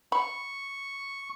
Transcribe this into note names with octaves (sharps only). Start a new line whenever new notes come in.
B5 C#6